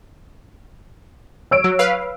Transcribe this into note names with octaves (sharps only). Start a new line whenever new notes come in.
C#5 E6 D7
F#3
B4 F5